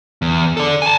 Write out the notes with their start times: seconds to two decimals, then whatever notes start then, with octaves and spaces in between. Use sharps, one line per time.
0.22 E2
0.57 A4 D5
0.82 G#5 A5